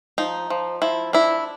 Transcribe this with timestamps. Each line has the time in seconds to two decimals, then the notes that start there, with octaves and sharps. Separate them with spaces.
0.18 F3 D#4
0.50 F3
0.82 F3 E4
1.13 D4 E4